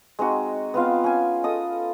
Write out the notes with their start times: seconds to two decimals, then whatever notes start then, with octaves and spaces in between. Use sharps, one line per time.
0.19 G#3 C4 D#4 F#4
0.74 B3 C4 F4 F5
1.04 C#4 G#5
1.43 A4 D#5 D#6